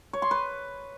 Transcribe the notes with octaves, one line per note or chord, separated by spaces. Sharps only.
C#5
C6
B4